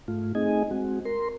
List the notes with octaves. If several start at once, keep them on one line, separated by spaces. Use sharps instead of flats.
G#2 A3 F4
A3 C4 D#4 G#4 D#5 G#5
G#3 C4 F#4
A#4 C6